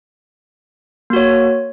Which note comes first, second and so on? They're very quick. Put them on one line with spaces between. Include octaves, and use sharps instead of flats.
A#3 F#4 C#5